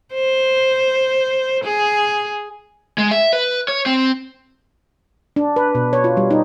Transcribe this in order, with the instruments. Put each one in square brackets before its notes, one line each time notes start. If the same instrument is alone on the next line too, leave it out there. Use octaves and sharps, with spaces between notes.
[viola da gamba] C5
G#4
[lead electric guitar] G#3
E5
B4
C#5
C4
[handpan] D4
B4
B2
C#5
F4
G3
D#4